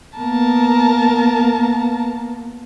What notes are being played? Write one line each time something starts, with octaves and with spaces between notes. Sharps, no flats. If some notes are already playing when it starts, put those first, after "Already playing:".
A#3 B3 A#4 A5